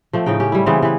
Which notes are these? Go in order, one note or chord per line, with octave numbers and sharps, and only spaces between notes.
F3 A3 C4
A2 C#3 D#4 G5
C#4 G4
G3 E4
C#3 E3 B3 C4
E3 B4